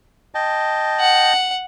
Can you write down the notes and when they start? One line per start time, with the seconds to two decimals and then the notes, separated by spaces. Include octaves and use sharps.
0.35 D#5 G5 A5
1.00 F#5